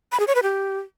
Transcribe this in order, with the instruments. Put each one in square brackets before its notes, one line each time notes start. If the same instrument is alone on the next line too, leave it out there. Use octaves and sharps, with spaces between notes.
[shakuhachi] B5
G#4
C#5
B4
G4